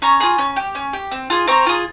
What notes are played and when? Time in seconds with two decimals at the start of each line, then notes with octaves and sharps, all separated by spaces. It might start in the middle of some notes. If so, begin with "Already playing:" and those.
0.02 C#4 A#5 C#6
0.20 F4 G#4
0.38 C#4
0.56 G4
0.75 C#4
0.93 G4
1.11 C4
1.30 F4 G#4
1.47 C4 A#5 C#6
1.66 F4 G#4